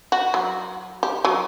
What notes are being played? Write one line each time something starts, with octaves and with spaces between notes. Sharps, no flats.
F#4
F#3
G4
F#3